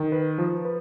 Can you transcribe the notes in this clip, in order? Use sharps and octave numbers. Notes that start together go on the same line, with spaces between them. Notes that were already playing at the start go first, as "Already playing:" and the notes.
Already playing: D#3
B4
F3
B4